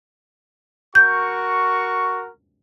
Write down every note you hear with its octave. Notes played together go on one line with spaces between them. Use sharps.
F#4 A#4 C#6 G6